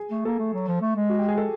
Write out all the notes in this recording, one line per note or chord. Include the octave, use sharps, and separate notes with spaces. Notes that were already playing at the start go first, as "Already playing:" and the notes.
Already playing: G#4
A3
A#3 A4
A3
F#3
F3
A3
G#3
F#4
G4
G#4
A4